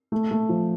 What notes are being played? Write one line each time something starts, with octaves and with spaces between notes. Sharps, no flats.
A3
A3
F3